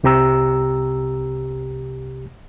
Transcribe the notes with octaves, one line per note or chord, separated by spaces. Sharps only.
C2 C3 G4 A#5 E6